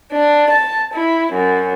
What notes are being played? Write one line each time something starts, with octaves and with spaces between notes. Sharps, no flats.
D4
A5
E4
F#2